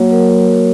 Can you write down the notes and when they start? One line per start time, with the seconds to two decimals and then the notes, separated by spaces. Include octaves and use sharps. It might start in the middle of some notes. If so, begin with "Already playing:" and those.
Already playing: F#3 A#3 F#4 C#5
0.11 F#3 A#4
0.29 F#3
0.48 F#3